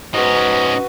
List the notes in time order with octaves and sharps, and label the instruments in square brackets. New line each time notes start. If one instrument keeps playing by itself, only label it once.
[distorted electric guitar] G#2 C#4 [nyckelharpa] F#4 B4 [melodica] D#5